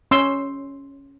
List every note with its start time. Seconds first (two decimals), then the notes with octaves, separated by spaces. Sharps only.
0.11 C#4 C6 E6